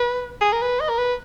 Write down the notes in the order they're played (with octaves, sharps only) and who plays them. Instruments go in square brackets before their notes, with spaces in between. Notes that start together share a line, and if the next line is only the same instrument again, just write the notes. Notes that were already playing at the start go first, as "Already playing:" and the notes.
Already playing: [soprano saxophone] B4
G#4
A#4
B4
D#5
A#4
B4